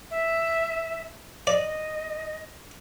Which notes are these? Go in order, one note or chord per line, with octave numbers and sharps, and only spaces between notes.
E5
D5 D#5